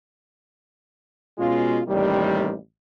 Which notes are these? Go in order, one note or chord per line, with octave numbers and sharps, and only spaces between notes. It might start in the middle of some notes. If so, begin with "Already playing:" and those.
B2 G#3 C#4 F4
A1 D#2 C3 D#3 G3